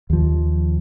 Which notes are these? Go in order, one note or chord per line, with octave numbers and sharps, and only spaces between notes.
D#2 F3